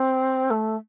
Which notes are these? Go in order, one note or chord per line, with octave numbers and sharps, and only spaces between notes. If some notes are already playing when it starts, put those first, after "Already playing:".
Already playing: C4
A3